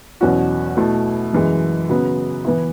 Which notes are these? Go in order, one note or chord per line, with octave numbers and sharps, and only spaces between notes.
E2 B2 F#3 C#4 F#4
B2 A3 E4
F#2 E3 G#3
C#3 F#3 B3
E3 B3 E4